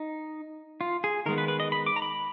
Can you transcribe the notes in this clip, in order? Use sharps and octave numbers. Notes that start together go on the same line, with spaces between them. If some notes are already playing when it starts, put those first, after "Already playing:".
Already playing: D#4
F4
G#4
D#3 G#3 B3 A#4
B4
B4
D#5
B5
D6
A#5
B5